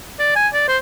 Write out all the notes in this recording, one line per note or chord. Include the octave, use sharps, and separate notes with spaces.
D5
G#5
D5
C5